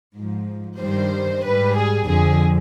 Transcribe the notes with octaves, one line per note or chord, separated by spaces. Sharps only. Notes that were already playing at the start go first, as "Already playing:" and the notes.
G#2 F3
G2 D#3 G3 C5
G#2 G3 B4
G#4
F2 D3 F3 G#4